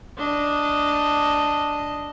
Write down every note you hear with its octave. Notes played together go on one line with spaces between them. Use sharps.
D4 D#5